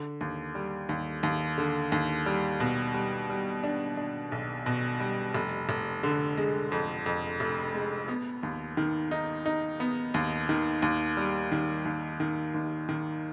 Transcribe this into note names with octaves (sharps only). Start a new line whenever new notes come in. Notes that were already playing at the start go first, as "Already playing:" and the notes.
Already playing: D3
D#2
G3
D#2
D#2
D3
D#2
G3
B2
G3
G3
D4
D4
B1
B2
G3
F1
F1
D3
G#3
F2
F2
F1
G#3
B3
D#2
D#3
D#4
D#4
B3
D#2
D#3
D#2
G3
D#3
D#2
D#3
D#2
D#3